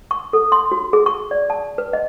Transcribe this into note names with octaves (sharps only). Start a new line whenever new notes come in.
C#6
A4
C6
F#4
G#4
C#6
D5
A5
B4
D#5